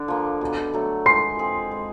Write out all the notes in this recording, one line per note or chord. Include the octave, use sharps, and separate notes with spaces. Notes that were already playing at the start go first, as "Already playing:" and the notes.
Already playing: D3 D4
F3 A#3
B2
F#3 A3
G#3 C6 C7
C4 F4 G#4
G#3